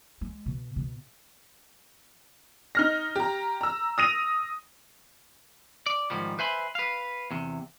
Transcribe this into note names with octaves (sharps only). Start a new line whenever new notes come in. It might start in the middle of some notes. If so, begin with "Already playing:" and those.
G#3
B2
B2
D#4 F6 A#6
G4 A#5
A#5 E6
D#6 A#6 D#7 F7
D5
G#2 D#3 F3 G3
B4 C5 E5 G#5 B5 C6
B4 F5
E2 C3